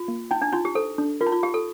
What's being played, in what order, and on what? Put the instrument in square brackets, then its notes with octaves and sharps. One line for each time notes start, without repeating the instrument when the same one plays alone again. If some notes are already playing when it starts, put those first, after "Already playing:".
Already playing: [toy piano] F4
[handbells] A#3
[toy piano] D#4 [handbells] G5
[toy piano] D4
[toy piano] D#4 [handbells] F4
[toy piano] G4
[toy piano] A4 [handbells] C5
[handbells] D4
[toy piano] F4 [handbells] A#4
[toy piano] D#4
F4
[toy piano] G4 [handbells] F5
[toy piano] A4